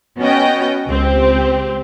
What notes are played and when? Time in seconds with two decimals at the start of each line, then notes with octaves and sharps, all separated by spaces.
0.19 B3 C#4 F#4 D#5 G5
0.89 C#2 C4 G4